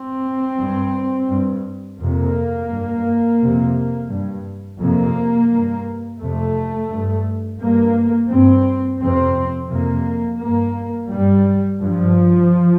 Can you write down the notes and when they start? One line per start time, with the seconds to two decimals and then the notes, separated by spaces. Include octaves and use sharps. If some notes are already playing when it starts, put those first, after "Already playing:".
Already playing: C4
0.60 G2
1.30 G2
2.00 F2 C3 A#3
2.71 G2
3.41 F2 C3
4.10 G2
4.80 F2 C3 A#3
5.50 G2
6.20 F2 C3 A3
6.91 G2
7.60 G2 A#3
8.30 G2 C4
9.00 F2 C3 C4
9.70 F2 C3 A#3
10.40 G2 A#3
11.10 G2 G3
11.80 G2 F3